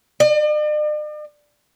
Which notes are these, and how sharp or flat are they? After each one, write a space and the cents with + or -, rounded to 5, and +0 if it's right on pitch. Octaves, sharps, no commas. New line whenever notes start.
D5 +45